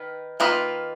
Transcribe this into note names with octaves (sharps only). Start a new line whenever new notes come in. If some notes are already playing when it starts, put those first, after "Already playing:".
Already playing: D#3 B4
D#3 A#3 F4 B4 D#5